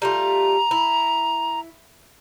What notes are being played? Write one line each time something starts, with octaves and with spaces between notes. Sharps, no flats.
G3 A3 F4 A#5
E4